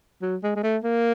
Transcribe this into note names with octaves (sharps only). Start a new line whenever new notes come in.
F#3
G#3
G#3
A3
A#3